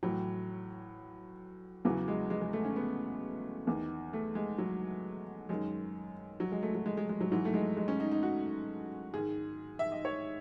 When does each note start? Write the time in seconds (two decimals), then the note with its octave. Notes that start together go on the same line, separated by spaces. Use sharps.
0.03 A2 E3 F#3
1.85 E2 C#3 E3 F#3
2.08 G#3
2.30 G#3
2.42 G#3
2.53 A3
2.65 C#4
2.76 B3
3.67 E2 D#3
4.13 A3
4.35 G#3
4.58 F#3
5.49 F#2 D#3 G#3
6.40 F#3
6.52 G#3
6.63 A3
6.75 F#3
6.86 G#3
6.97 G#3
7.09 G#3
7.21 F#3
7.31 G#2 E3 F#3
7.45 A3
7.54 G#3
7.77 G#3
7.88 C#4
8.00 D#4
8.12 D#4
8.23 F#4
9.14 G#2 D#3 G#4
9.79 E5
9.92 D#5
10.05 C#5